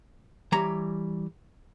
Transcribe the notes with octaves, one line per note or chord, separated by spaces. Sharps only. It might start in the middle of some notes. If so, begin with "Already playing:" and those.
E3 G3 C#5 A#5